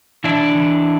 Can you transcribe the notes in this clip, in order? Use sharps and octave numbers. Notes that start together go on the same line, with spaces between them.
E3 D4 E4
E3